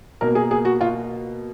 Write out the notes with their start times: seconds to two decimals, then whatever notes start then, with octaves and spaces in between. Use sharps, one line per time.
0.21 B2 A#3 A#4
0.35 G#4
0.51 G#4
0.65 F#4
0.81 F4